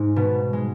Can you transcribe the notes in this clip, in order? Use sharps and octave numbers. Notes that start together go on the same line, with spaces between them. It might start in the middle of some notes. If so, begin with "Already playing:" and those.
Already playing: G#2 G#3
B2 B3
G#3